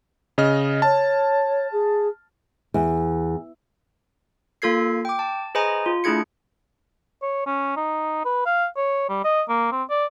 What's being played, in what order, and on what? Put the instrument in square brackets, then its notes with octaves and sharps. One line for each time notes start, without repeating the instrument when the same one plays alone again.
[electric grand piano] C#3 D#5 F6
[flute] C#5 [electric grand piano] A5
[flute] G#4
[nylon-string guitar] E2
[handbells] A#3 F4 A4 G#6 C7
G5 D6
A5
G#4 B4 C5 D#5 G#5 A#5
F4
A3 D4 E4 G#4 G#6 C#7
[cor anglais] C#5
C#4
D#4
B4
F5
C#5
G3
D#5
A#3
C4
D5